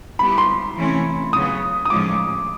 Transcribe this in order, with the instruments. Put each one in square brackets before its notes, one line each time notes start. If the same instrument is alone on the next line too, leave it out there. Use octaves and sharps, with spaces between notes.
[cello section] G3 B3 E4 G4 [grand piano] B5
[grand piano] C6
[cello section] C3 E3 A3 C#4 E4
[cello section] C#3 F#3 B3 [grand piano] D#6
[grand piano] D#6
[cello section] A2 F3 G#3 C#4 F4 [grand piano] D6